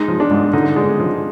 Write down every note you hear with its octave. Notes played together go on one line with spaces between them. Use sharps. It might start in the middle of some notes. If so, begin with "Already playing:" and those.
Already playing: G#3 D#4
F3
D4
G#2
D3 D#4
G#3
F3